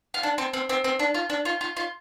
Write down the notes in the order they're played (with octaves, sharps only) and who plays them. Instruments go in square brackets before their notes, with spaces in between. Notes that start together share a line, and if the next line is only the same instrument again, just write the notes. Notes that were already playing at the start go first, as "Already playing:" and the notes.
[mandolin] F4
D4
C4
C4
C4
C4
D4
F4
D4
F4
F4
F4